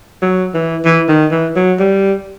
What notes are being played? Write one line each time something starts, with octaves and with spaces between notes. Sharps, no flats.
F#3
E3
E3
D#3
E3
F#3
G3